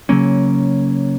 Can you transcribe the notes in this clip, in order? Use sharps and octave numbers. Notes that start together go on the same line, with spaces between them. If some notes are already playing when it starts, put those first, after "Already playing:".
C#3 F#3 A#3 C#4